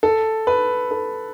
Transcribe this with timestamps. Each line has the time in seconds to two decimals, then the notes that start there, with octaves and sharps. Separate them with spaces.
0.03 A4
0.47 B4
0.91 A4